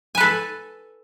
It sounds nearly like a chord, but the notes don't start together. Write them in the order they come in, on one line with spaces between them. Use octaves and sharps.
G#5 B4 A4